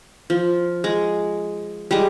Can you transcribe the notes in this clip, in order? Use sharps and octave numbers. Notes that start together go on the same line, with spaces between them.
F3
G#3
G3 G#3